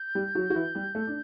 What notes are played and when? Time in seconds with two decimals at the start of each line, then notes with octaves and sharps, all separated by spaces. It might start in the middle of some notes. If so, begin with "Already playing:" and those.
Already playing: G6
0.15 G3 G4
0.35 F#3 F#4
0.50 F#4
0.55 E3 E4
0.75 G3 G4
0.95 A3 A4
1.07 D4